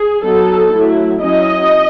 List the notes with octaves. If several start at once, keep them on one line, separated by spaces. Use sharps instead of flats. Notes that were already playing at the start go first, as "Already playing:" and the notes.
Already playing: G#4
F#3 B3 D#4 A4
F#3 A3 E4
F#3 C#4 E4 D#5